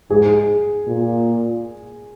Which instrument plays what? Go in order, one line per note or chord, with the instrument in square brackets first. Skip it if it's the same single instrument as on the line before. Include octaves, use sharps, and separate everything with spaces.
[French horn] G#2 [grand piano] G#4
[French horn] A#2